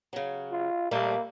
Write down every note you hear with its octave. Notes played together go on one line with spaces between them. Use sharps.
C#3 F#3
F4
A#2 G3 A3 A#3